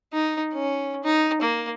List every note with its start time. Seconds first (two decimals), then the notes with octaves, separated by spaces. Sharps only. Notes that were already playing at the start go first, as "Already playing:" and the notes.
0.13 D#4
0.53 C#4
1.04 D#4
1.42 A#3